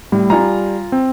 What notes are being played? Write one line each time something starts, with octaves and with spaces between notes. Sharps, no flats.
A2 G3
G3 F4 G#5 A#5
C4